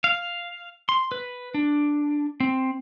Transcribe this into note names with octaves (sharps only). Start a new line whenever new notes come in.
F5
C6
B4
D4
C4